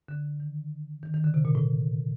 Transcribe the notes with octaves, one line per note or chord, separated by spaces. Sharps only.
D3
D#3
D#3
D#3
D3
C3
A#2
A2